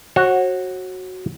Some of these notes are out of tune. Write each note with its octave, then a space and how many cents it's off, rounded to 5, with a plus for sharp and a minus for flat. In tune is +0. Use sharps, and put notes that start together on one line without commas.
F#4 +0 C#5 -45